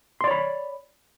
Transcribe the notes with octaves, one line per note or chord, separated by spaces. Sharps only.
C#5 D5 B5 C6